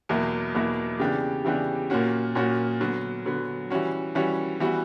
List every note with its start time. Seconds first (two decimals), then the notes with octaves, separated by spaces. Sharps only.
0.09 E2 B2 F#3 A#3 E4
0.55 E2 B2 F#3 A#3 E4
1.00 C#3 E3 B3 D4 G4
1.45 C#3 E3 B3 D4 G4
1.90 A#2 A#3 C#4 F#4
2.35 A#2 A#3 C#4 F#4
2.80 D3 F#3 B3
3.26 D3 F#3 B3
3.71 E3 G3 C#4 F#4
4.15 E3 G3 C#4 F#4
4.60 E3 G3 B3 F#4